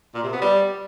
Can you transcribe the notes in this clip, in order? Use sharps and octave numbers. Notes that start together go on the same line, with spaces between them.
A#2
C3
B3
G3